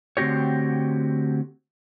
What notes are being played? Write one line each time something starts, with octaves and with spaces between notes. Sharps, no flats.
D3 A3 C4 F#4 G4 C#5